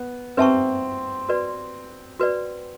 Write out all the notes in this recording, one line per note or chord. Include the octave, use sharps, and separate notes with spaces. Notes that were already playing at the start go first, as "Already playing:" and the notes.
Already playing: B3
C4 B4 E5 A5 C#6
F#4 B4 D5
F#4 B4 D5